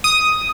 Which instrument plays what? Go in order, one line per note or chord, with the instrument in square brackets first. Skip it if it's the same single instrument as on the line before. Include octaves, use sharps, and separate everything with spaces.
[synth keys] D#6